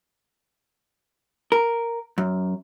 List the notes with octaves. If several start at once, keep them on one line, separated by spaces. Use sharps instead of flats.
A#4
F#2